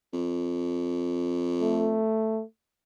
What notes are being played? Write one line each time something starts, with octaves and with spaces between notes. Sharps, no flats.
F2
A3